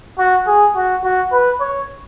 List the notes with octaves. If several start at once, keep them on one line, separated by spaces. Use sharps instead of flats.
F#4
G#4
F#4
F#4
B4
C#5